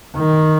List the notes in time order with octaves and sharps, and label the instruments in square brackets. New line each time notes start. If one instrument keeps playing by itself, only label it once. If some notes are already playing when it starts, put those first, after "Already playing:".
[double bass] D#3